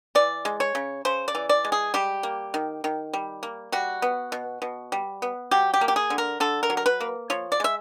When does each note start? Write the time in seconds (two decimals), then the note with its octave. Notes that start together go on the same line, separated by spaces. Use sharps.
0.15 E3 D5
0.45 G#3
0.60 C#5
0.75 C#3
1.05 C#3 C5
1.28 D5
1.35 E3
1.49 D5
1.65 G#3
1.72 G#4
1.94 G3 G4
2.23 A#3
2.54 D#3
2.84 D#3
3.13 G3
3.43 A#3
3.72 G3 F#4
4.02 B3
4.32 B2
4.62 B2
4.92 G3
5.22 B3
5.51 F#3 G4
5.74 G4
5.81 A#3
5.88 G4
5.96 G#4
6.10 D3
6.18 A#4
6.40 D3 A4
6.63 A#4
6.70 F#3
6.77 A#4
6.86 B4
7.00 A#3
7.30 F3 C#5
7.52 D5
7.60 G#3 E5